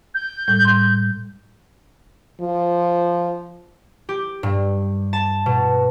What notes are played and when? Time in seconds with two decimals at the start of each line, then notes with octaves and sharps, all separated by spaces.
0.14 G6
0.48 A2 G3
0.65 C6
2.41 F3
4.09 G4
4.43 G2
5.13 A5
5.46 B2